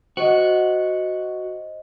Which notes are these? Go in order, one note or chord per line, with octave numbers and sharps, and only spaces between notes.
F#4 C5 D#5